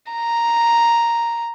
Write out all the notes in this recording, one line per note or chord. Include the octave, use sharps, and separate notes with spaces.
A#5